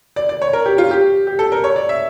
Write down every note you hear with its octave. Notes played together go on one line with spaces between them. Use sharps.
D5
D5
C#5
A#4
G4
F4
G4
G4
A4
A#4
C#5
D5
E5